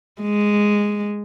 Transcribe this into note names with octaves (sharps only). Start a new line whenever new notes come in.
G#3